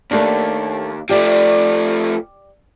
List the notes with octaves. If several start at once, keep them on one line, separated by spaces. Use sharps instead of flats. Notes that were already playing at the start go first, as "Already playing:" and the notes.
D#2 A3 A#3 D4
F3 A3 G4 D5